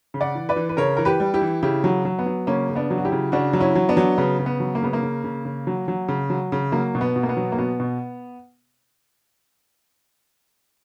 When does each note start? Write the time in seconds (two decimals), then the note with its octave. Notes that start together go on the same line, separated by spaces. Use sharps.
0.14 C#3
0.21 D5 F#5
0.35 E3
0.49 B4 D5
0.56 E3
0.69 B4
0.77 C#3 A#4 C#5
0.97 E3 A#4
1.05 G4 B4
1.20 G3
1.34 E4 G4
1.42 E3
1.63 C#3 E4 G4
1.84 F#3
2.05 F#3
2.19 B3
2.26 F#3
2.47 C#3 A#3 C#4
2.69 C#3
2.75 B3 D4
2.91 F#3
2.98 F#4
3.05 E4 G4
3.12 C#3
3.32 C#3 D4 F#4
3.53 F#3
3.60 C#4 E4
3.75 F#3
3.89 B3 D4
3.97 F#3
4.18 C#3 B3
4.39 C#3
4.46 B3
4.60 F#3
4.75 A#3
4.82 C#3 B3
4.93 A#3
5.03 C#3
5.24 C#3
5.45 C#3
5.67 F#3
5.88 F#3
6.08 C#3
6.30 F#3
6.52 C#3
6.72 F#3 A#3
6.95 B2
7.01 B3
7.16 B2
7.23 A#3
7.29 B3
7.37 F#3
7.52 A#3
7.58 B2 B3
7.80 B2